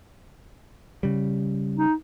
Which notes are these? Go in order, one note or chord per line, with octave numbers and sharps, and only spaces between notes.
C#3 G3
D#4